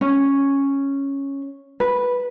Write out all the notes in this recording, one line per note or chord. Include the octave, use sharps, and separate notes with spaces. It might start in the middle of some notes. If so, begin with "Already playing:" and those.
C#4
B4